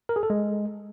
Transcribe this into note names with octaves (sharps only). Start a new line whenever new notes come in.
A#4
G#4
A4
G#3